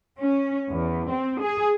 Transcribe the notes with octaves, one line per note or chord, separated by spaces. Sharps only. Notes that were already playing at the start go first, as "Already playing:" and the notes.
C#4
E2
C4
G#4